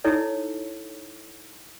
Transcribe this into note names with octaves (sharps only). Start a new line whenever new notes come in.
D#4 E4 A4 C#5